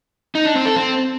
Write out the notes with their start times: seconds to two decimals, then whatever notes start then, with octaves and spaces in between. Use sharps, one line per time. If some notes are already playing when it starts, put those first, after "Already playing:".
0.35 D#4
0.45 D4
0.55 C4
0.66 A4
0.76 C4